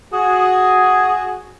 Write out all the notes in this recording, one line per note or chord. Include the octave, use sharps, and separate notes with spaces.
F#4 G#4